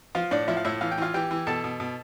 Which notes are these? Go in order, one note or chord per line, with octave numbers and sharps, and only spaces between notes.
F3 F4 F5
A2 D4 D5
F3 E4 E5
F5
A2 E4 E5
E3 F5
G5
E3 F4 F5
E3 G4 G5
E3
B2 A4 A5
B2
B2